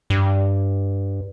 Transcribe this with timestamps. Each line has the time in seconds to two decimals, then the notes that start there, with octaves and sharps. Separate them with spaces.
0.10 G2